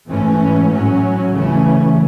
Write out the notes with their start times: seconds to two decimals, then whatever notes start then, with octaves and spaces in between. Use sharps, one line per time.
0.10 G#2 E3 A3 C#4
0.71 A2 F#3 C#4
1.33 C#3 E3 A3 C#4